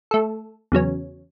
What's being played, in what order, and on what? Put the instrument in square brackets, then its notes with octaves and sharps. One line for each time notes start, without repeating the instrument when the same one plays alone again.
[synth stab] A3 A4
E2 C#3 F#3 C#4